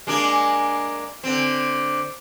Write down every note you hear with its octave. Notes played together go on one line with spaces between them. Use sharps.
G#3 A#3 D4
D3 C4